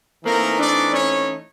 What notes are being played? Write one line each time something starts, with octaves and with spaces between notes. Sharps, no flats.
E3 A3 A#3 C4 D#4 A#4
D4 D5
C#4 C#5